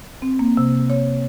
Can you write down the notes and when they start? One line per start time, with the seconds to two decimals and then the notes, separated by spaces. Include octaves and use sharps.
0.22 C4
0.39 A#3
0.57 C3
0.90 C#5